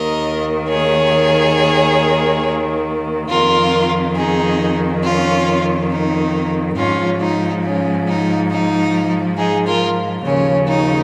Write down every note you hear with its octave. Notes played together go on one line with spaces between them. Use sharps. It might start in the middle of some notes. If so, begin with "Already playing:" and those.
Already playing: D#2 D#3 A#4 D#5
G#4 C#5
F2 D#3 F4 A#4
D#4 G#4
C#4 F4
D#4
G#2 F3 C#4 F4
D#4
C#4
D#4
D#4
D#4 G#4
F4 A#4
D#2 C#3 F3 C#4
D#4